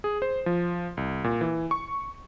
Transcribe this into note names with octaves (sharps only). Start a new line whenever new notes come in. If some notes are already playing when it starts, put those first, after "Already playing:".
G#4
C5
F3
C2
A#2
E3
C#6